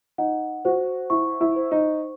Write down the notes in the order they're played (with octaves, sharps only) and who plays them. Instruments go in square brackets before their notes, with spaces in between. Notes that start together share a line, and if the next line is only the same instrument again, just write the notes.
[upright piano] D#4 [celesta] F#5
[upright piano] F#4 [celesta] C5
[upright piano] E4 [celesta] C#6
[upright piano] E4
[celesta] C5
[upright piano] D#4